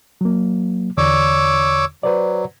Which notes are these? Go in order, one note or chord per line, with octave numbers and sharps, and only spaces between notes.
F#3 A#3
E2 D3 C#5 D5 D6 E6
F#3 B4 C5 D5